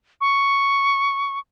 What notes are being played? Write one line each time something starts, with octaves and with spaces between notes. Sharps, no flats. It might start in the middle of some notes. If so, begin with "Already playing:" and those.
C#6